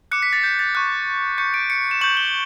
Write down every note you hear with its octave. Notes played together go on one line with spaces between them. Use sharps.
D6 F#6 C#7
B6
A6
G6
A6
C#6 F#6
C#6 G6 C#7
D7
C#7
E7
C#6 G6 F#7
G7